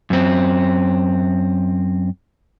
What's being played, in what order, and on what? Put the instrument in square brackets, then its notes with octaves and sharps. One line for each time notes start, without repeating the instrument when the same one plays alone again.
[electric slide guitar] F#2 C4